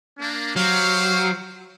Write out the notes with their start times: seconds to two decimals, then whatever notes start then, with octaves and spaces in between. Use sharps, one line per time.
0.19 A#3 D4
0.56 F#3 G4 C5 F5